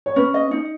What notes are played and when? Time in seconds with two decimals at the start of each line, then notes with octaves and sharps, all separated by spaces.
0.06 C#5
0.16 C#4 B4
0.34 D#5
0.51 D#4